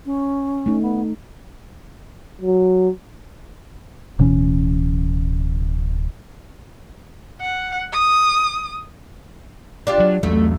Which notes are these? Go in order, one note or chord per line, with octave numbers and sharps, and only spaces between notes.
C#4
A3 D#4
B3
F#3
D1 B2 E3 C#4
F#5
D#6
D4 F4 G4
F#3
E2 F#3 A3